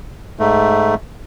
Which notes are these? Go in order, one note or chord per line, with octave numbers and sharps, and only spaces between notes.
G#2 A3